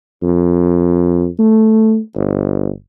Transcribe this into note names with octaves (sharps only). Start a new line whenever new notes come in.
F2
A3
G1